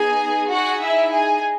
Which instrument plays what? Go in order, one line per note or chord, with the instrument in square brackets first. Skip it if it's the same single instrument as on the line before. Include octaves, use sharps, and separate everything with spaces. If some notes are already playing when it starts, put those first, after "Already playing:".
Already playing: [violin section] B3 D#4 G#4 G#5
D#4 F#4 G#4 F#5
E4 E5
G#4 G#5